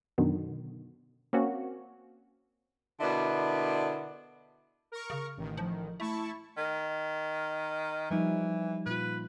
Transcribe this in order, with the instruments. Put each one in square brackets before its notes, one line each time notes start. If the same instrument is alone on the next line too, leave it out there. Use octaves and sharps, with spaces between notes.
[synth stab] F#2 B2 D3 D#3
A#3 C4 C#4 F#4
[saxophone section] B2 D3 B3 E4 A#4 D5
[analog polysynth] A#4 C#6
[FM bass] C#3
[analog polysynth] A1 D#3
[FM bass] F3
[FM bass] A3 [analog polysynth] E4 A5 C#6
[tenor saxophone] D#3
[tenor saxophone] E3 [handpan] F3 G3 D#4
[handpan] A#2 F4 [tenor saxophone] B4